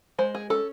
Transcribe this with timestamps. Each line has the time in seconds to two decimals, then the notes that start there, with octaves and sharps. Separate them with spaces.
0.19 G#3 C5
0.35 G#4
0.50 C#4 A4